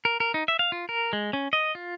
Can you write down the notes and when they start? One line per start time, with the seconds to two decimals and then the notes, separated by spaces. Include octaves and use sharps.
0.05 A#4
0.20 A#4
0.34 D#4
0.48 E5
0.59 F5
0.72 F4
0.89 A#4
1.13 G#3
1.33 C#4
1.53 D#5
1.75 F4